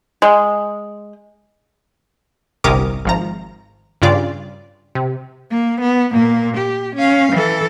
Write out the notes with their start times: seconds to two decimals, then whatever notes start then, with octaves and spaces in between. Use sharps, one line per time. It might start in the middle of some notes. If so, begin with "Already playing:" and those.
0.22 G#3
2.64 G1 C2 C3 A#4 D6 D#6
3.05 G#1 F3 A#5
4.02 G2 C#3 F4 D5
4.95 C3
5.51 A#3
5.81 B3
6.12 A#2 A#3
6.57 G4
6.95 C#4 F5
7.32 E3 A4